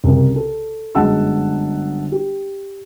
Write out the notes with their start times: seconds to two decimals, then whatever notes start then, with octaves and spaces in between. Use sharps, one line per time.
0.04 C2 C#3 A#4
0.36 A4
0.95 G1 F#2 G#3 F#5 A5 E6
2.12 G4